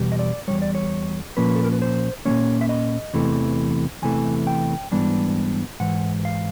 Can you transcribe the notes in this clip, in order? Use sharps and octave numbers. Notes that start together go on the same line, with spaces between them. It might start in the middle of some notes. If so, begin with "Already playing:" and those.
Already playing: E2 B2 G3
D#5
D5
E2 B2 G3 C#5
D5
C#5
A#2 F3 A#3 C#4 B4
A4
A#4
B4
C5
A#2 F3 A#3 C#4 C#5
E5
D#5
E2 C3 E3 A3
E2 C3 E3 A3 G#5
G5
G#2 E3 G3 B3 D4
G#2 E3 F#5
F5